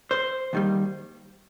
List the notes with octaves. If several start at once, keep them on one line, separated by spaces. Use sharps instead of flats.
C5
D#2 D#3 G3